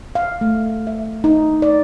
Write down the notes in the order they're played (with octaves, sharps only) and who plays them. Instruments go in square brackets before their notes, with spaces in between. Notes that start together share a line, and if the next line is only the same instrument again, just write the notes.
[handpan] F5
A3
E5
D#4
D5